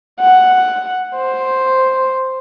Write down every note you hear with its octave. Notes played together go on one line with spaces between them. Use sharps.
F#5
C5